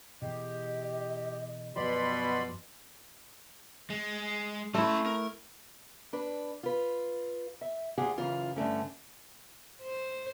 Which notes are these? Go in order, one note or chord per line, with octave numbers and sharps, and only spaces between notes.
B2 E3 G4 G#4 D#5
F#2 B2 F3 G4 D5 B5 C6
G#3
A3 C#4 E4 C6
A#4
D4 B4
F4 B4
E5
D2 F4 G4 G#4 F#5 G#5
F#2 C#3 E3 F4
G2 D3 A3 C#4
C5